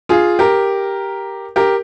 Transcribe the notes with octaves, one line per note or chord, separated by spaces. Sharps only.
F4 G#4
G4 A#4
G4 A#4